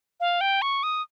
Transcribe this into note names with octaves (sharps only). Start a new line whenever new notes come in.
F5
G5
C#6
D#6